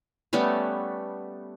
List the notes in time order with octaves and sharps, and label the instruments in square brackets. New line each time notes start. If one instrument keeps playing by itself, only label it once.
[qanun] G3 A3 B3 C#4